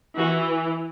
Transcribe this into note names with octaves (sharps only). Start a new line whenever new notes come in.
E3 F#4